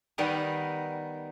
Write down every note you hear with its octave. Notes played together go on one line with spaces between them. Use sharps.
D#3 G3 B3 D#4 A#4